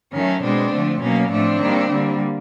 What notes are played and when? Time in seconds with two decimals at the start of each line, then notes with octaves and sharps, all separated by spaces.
0.13 D#3 F#3 A3 C#4
0.42 B2 G#3 C4 D4
0.72 D3 F3 A3
1.02 B2 F#3 A#3 C#4
1.31 A2 F3 A3 C4 D4
1.61 D#3 G3 A#3
1.90 D3 G3 A#3